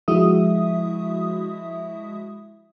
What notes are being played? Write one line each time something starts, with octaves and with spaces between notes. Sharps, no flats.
F3 G#3 E4 F#4 E5 D#6